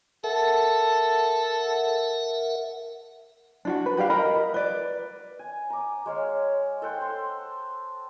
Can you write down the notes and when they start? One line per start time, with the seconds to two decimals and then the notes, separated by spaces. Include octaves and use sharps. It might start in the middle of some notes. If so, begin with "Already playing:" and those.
0.24 A4 A#4 E5 F#5
3.65 D4 F4 F#4
3.86 B4
3.97 F#4 G4 D5 F5
4.10 A#4 D#5 B5
4.54 B4 D5
5.39 G#5
5.70 A#5 D6
6.06 G#3 C#5 F5
6.82 A4 C5 F#5 G5
7.02 C6